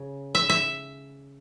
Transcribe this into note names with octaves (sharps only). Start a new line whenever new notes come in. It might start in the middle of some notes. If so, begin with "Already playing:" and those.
Already playing: C#3
E5
E5